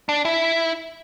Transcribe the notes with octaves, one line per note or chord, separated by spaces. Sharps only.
D4
E4